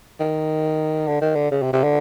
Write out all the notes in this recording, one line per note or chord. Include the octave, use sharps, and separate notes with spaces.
D#3
D3
D#3
D3
C#3
C3
C3
D3